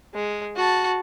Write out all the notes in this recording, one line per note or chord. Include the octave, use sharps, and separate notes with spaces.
G#3
F#4 A5